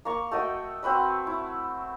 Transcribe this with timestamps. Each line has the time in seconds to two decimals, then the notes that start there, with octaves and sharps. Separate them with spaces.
0.05 A#3 A#5 C#6
0.31 A3 F#4 D#5 G5
0.83 C4 F#4 B4 E5
1.27 E4